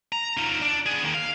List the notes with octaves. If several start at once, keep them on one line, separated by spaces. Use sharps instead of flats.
A#5
D#4 F4
D4
B3 G#4
D#3 A#3
F5